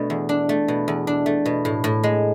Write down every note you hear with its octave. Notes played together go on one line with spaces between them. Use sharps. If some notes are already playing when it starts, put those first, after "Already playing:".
Already playing: B2 A3 D4
E2
D4
A3
B2
E2
D4
A3
B2
A2
A2
G#3